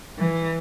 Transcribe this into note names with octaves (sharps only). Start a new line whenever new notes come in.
E3